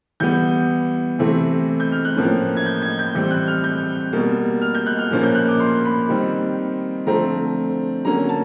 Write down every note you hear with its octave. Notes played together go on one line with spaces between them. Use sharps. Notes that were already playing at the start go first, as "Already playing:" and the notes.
E3 G3 B3 G6
C3 E3 A3 C4
G6
F6
F#6
A2 F3 A#3 C#4
G#6
G6
G#6
G6
A2 E3 G3 C4 G6
F#6
F6
G6
B2 G3 A#3
F6
G6
F#6
F6
A#2 F3 A#3 C#4
G6
F#6
D6
C6
B5
D#3 G3 C4
D3 F3 A3 C4 A#5
D3 F#3 A#3 C#4 A#5
A5